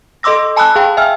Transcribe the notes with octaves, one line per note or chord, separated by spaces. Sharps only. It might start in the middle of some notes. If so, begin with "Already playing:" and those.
A4 D#5 C6 D6 E6 A#6
G#5 A5 B5 D#6 E6 F#6
G#4 F5 G5 A5 B5
E5 G#5 E6 F6